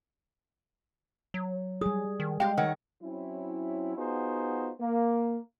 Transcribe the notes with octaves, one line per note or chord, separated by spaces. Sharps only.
F#3
G3 G#4 D#6
D#3
G#3 G4 F5 G5
D#3 A#4 C#5 F#5
F#3 C4 C#4 E4
B3 D#4 F4 F#4 G#4 C5
A#3